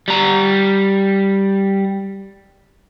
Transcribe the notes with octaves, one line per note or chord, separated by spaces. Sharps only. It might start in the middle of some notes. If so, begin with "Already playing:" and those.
G3 A#5